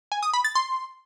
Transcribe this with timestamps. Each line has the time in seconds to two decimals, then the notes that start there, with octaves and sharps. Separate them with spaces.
0.12 G#5
0.23 D#6
0.34 B5
0.44 A6
0.55 C6